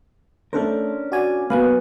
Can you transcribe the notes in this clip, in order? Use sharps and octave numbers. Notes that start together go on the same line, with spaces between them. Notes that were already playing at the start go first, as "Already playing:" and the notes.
A3 C#4 D4 A4 A#4 C5
F#4 D5 G#5
F#3 A#3 B3 B4 F5 G#5 B5